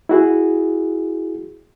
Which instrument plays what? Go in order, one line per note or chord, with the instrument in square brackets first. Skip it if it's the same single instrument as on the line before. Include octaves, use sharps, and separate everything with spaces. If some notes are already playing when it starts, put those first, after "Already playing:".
[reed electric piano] E4 F#4 G#4